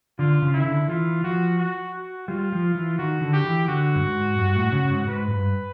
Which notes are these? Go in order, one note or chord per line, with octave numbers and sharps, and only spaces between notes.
D3 F4
C#3
D#3 E4
D3
E3 F4
F3 F#4
F#4
F#4
G3 F4
F3
E3
D#3 F#4
D3
G4
E3
D3 F#4
G2
G#2
G2
A2
C#3
G#2
G#2 B4
G2